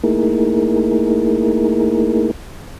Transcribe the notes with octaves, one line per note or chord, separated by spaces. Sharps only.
A3 A#3 D#4 E4 G#4 A#4